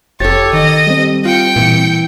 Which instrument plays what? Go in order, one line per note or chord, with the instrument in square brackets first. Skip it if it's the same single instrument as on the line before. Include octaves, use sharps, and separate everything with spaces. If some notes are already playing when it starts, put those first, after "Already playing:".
[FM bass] F1 [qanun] G4 A4 [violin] C#5 [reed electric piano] A6
[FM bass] D#3 [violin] D#5
[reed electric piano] G3 C4
[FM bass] F4 [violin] G5 C#7
[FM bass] A#2 [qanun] E3